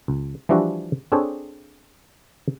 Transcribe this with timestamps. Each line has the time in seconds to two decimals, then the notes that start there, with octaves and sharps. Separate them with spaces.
0.08 C#2
0.49 E3 F3 G3 D4 E4 F#4
1.12 C4 D4 G#4 A4 C5 C#5